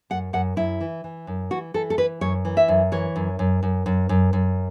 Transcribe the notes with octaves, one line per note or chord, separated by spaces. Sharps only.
F#2 F#5
F#2 F#5
F#2 E4
E3
E3
F#2
E3 F#4
E3 A4
A4
E3 B4
F#2 C#5
E3
E5
F#2
E3 C#5
F#2
F#2
F#2
F#2
F#2
F#2